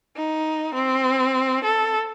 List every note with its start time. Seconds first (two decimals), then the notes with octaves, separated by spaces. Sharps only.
0.16 D#4
0.74 C4
1.64 A4